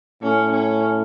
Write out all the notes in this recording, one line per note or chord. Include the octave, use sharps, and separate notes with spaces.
A2 C#4
C#4